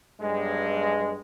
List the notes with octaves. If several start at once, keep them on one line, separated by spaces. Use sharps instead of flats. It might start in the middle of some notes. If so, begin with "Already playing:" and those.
B1 G2 G#3